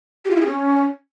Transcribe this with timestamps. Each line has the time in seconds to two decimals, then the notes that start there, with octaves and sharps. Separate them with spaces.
0.25 G4
0.30 F4
0.36 E4
0.41 G#4
0.46 C#4